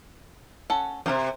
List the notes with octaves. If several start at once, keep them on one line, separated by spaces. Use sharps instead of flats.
C#4 A4 F#5
F#2 C3 A#4 C5